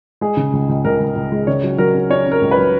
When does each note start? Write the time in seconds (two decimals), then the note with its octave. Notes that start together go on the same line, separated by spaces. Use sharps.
0.21 G#3 G#4
0.37 C#3
0.53 C#2
0.69 C#2
0.85 C#2 A#4
1.00 C#2
1.16 C#2
1.32 G#3
1.47 C#3 C#5
1.63 F#3
1.78 F#3 A#4
1.94 C#4
2.10 C#4 C#5
2.26 C#4
2.32 A#4
2.42 C#2
2.51 B4
2.57 F#3